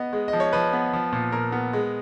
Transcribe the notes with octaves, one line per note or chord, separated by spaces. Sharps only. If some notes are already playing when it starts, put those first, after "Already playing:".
Already playing: B3 D#5
G#3
D#5
F3
C#5
F3 B4
B3
F3
A#2
A#2 A#4
B3
G#3